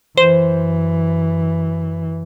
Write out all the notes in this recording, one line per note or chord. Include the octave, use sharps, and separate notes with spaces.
F#2 E3 C5